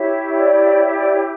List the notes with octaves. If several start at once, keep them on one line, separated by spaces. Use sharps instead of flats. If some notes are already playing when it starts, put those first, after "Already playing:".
Already playing: E4 G4 C#5 E5
D5
E5
D5
C#5